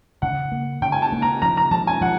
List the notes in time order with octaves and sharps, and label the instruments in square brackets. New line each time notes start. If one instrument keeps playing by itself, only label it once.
[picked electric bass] C#3 [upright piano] F#5
[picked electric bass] A#3
[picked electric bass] C#3 [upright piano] G5
[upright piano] G#5
A5
[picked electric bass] A#3
[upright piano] A#5
[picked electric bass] F3 [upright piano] A#5
[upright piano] A#5
[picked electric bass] F3 [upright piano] A5
[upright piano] G#5
[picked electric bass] F3 [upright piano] F#5